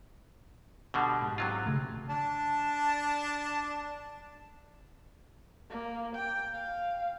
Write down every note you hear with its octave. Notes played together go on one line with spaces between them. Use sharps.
B2 D3 G3
G#2
C3 F#3 F4
A1 C#3 A3
D4 A5
A#3
G5
F5